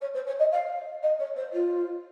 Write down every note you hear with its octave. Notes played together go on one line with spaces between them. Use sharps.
C#5
C5
C#5
D#5
F5
D#5
C#5
C5
F4